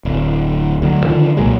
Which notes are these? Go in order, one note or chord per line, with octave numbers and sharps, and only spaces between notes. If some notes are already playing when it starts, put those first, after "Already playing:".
D1
D2 F#3
D3 D#3 F3
B1 A#2 F#3 G#3